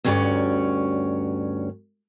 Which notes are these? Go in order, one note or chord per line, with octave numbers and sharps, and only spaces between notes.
D2 G2 C#4 F#4 C#5 D5